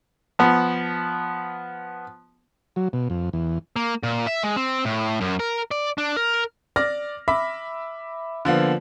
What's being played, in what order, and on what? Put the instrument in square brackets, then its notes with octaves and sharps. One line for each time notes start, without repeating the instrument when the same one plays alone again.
[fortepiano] F3 B3
[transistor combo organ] F#3
B2
F2
E2
[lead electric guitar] A#3
A#2
E5
G#3
C4
A2
F#2
A#4
D5
D4
A#4
[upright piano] D5 D6 F6 A#6
E5 B5 D6 B6
D3 F3 A#3 B3